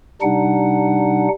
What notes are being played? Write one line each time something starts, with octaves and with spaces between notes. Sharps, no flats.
C3 G3 D4 D#4 F#5